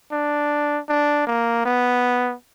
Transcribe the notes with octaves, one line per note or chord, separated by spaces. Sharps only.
D4
D4
A#3
B3